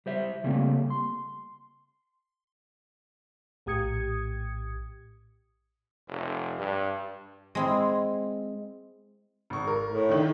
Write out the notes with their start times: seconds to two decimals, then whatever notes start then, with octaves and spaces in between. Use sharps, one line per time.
0.06 G3 C5 E5
0.44 C#3 G3 A3 A#3 C4
0.90 C6
3.66 A#1 A2 G4 D#6 G#6 C#7
6.08 F1
6.59 G2
7.55 G#3 C4 E4
9.50 G#1 C#6
9.67 A#4
9.89 A2
10.09 D3 D#3